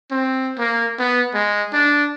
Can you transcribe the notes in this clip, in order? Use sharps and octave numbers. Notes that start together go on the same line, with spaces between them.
C4
A#3
B3
G#3
D4